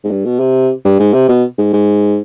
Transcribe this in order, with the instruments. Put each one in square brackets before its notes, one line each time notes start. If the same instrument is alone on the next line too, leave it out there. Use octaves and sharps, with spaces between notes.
[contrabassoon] G#2
G2
B2
C3
G2
G#2
C3
B2
G#2
G#2